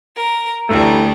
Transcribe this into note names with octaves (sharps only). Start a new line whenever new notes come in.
A#4
D2 E3 G3 A3 D4